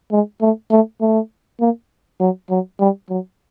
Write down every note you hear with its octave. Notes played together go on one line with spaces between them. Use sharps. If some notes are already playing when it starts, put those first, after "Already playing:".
G#3
A3
A3
A3
A#3
F#3
F#3
G3
F#3